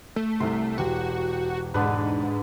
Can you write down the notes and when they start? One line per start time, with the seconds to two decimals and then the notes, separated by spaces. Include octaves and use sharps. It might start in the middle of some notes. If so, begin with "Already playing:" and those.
0.16 A3
0.40 C2 C3 C6
0.78 E1 F#4 G4 G5
1.74 G#2 D3 G#4 B4